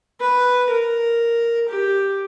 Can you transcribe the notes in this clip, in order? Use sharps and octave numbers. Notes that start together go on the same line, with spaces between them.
B4
A#4
G4